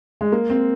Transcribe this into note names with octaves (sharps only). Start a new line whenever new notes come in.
G#3
A#3
C4